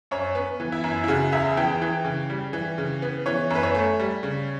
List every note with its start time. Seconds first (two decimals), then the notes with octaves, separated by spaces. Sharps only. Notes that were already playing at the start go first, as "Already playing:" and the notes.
0.11 F#2 C#5
0.35 B3
0.60 E3
0.72 E4
0.84 F#2
1.04 E4
1.08 C#3 F#4
1.32 E2 E5
1.57 E3 G5
1.82 E3
2.05 C#3
2.30 G3
2.53 E3
2.78 C#3
3.02 B3
3.26 E3 C#5
3.50 F#2 B4
3.63 C#5
3.75 A3
4.00 G3
4.23 C#3